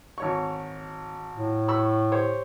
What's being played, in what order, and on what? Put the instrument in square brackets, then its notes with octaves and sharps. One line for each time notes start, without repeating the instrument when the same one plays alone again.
[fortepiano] G#1 C#5 C#6
[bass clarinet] A2
[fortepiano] B5 C#6 E6
G4 C5 C#5